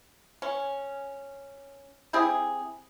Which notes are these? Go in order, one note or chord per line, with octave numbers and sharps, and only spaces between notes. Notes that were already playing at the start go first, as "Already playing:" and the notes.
C#4
C4 E4 G4 G#4